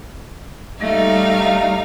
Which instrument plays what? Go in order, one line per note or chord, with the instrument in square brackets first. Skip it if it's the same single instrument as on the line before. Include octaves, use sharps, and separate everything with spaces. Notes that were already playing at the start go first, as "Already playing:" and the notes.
[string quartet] G3 D#4 F5 [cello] A3